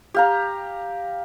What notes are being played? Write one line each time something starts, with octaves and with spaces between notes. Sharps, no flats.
G4 F5 A#5